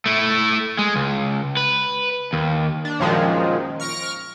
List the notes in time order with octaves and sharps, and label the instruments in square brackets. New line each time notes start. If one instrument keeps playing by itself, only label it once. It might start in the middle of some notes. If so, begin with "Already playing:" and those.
[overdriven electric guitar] A3 E4
G#3
C#2
B4
D#2
[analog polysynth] D4
F#2 A#2 D#3 F3 G#3
C#6 F6 A#6 D7